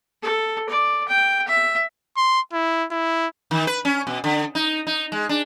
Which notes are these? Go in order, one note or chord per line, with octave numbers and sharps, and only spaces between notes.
A4
D5
G5
E5
C6
E4
E4
D#3
B4
C#4
B2
D3
D#4
D#4
G#3
D4